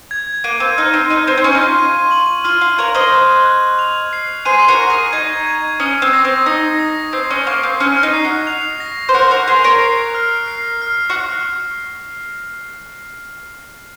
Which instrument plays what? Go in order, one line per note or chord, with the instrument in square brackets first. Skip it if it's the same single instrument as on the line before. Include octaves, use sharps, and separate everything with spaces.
[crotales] G#6
[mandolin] A#3 [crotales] D#7
[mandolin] C4
[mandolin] D#4 [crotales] F6
[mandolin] C4
[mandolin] D#4 [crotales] F6
[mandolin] C4
C4
[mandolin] C#4 [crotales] C#6
[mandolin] D#4
F4
[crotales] D#7
F#7
[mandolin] F4 [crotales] F6
[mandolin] F4
[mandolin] A#4 C#5 [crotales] G#6
[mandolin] C5 D#5
[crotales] F#6
F#6
F7
C7
[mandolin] G#4 C5 [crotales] D#7
[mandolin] F#4 A#4
[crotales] C#6
[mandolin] G#4
[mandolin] D#4 [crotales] G#6
[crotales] G#6
[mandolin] C#4 [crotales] D#6
[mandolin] C4
[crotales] A#6
[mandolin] C4
[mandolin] D#4 [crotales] D#6
[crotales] A#6
[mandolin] C4 [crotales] C7
[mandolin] C#4
[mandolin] A#3 [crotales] C#6
[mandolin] C4
[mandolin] C#4 [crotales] F6
[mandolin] D#4
[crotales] C7
[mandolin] F#4
[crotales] F7
A#6
[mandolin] C5
[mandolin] F#4 A#4 [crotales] F#6
[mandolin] F#4 A#4
[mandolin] G#4 C5 [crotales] F7
[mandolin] A#4 C#5
[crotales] C7
F6
C7
F6
[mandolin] F#4